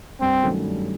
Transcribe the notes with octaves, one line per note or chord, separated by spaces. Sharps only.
G2 C4
D#3 F#3 A3 C#4
G2